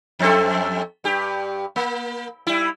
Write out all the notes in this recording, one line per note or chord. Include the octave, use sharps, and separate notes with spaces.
F2 C4 A4
G2 G4
A#3
G3 E4